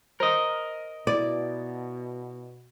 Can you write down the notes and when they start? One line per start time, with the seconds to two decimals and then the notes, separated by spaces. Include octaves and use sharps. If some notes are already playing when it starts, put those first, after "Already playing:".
0.20 A#4 C5 D#5
1.07 B2 E4 D5